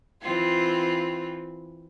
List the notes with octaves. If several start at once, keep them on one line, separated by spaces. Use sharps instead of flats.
E3 C4 F4